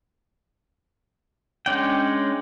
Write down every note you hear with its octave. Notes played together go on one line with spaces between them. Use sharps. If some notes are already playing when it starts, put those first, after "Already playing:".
G#3 C#4 D4 G5